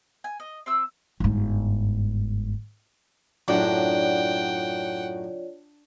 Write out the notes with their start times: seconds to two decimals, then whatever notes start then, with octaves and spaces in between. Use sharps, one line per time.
0.24 G#5
0.40 D#5
0.66 C4 E5 E6
1.20 G1 G#2
3.48 F#2 A2 D4 F4 C#5 D5 F#5 G5